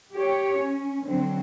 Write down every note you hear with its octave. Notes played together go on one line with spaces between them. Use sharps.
G4 C#5
C#4
D3 F#3 C4